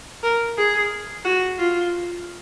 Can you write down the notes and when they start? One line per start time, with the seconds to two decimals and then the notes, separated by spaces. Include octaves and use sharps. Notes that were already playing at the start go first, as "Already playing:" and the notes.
0.23 A#4
0.57 G#4
1.25 F#4
1.59 F4